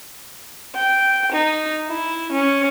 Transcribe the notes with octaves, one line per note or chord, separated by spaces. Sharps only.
G5
D#4
E4
C#4